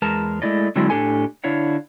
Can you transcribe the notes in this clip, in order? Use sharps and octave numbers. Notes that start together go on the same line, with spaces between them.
E2 G#3 A#4 B4 A5 A#5
G#3 A3 E4 D5 D#5
D3 F#3 G#3 C4 D4 E4
A2 D4 G4 A4 G#5
D3 D4 E4 C#5 F5 F#5